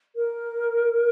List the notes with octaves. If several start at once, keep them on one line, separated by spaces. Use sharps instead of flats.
A#4